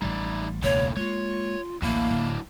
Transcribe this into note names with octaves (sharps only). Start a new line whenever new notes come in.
A1 G3 D#4 E4 D5
E1 C#2 A2 D3 A#3 C#5
G#3 A#3 F4 C#5
A1 D2 F#3 A#3 D4 E4
D1 D2